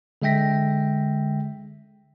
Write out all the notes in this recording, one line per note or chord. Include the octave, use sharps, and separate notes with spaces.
D3 G#3 E5 G5 A#6 B6